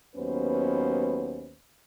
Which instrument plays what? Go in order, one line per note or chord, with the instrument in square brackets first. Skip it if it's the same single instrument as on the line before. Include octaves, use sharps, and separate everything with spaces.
[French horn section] D#2 F#3 B3 C#4 B4 C5